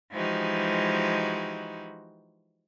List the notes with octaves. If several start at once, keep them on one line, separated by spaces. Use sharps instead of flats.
E3 F3 G#3 D#4 F#4 G4